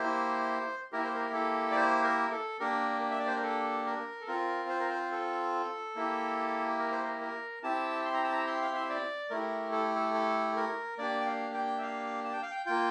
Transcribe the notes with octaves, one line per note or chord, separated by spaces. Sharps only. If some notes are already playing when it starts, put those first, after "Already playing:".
Already playing: A#3 E4 G4 C5
A#3 E4 G4 A#4
C5
A#4
A4
D5
C5
A#4
A4
A#3 D4 G4 A#4
E5
D5
C5
A#4
A4
A#4
A4
C4 F4 A#4
C5
A#4
C5
A4
A#3 E4 G4
A#4
C5
A#4
A#4
C4 E4 G4 A5
C6
A#5
A5
A#5
C6
F5
E5
D5
A3 E4 G4 A#4
A4
A4
A4
A#4
A#3 D4 G4 D5
G5
F5
G5
E5
F5
A5
G5
F5
G5
A#3 F4 G5